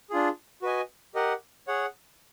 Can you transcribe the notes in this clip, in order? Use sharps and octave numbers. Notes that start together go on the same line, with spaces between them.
D4 F4 G#4
F#4 B4 D#5 G#5
G4 A#4 D#5 F#5
G#4 C#5 F#5